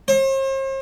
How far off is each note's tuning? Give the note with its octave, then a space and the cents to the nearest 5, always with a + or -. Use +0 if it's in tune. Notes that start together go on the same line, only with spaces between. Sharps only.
C5 +45